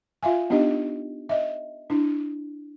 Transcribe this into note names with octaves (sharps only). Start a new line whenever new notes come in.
F4 E5 F5 G#5
B3 D4 D#4 G4 D#5
D#5 E5
D4 E4